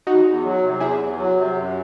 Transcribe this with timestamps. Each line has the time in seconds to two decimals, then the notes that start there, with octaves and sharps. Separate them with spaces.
0.07 E2 D#4 F#4
0.25 E2
0.44 F#3
0.62 C3
0.80 E2 E4 G#4
0.99 E2
1.18 F#3
1.36 C3
1.55 F#2